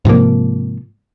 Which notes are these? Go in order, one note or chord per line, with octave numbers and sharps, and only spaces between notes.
G#2 C3 F3 A#3